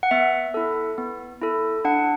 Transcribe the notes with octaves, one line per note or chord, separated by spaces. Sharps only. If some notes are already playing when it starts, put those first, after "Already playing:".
F#5
B3 E5
E4 A4
B3
E4 A4
D4 F#5